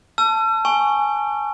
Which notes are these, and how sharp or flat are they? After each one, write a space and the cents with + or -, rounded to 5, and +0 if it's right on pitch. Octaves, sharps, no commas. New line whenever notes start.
A5 +0 E6 +45
G#5 +0 C#6 +0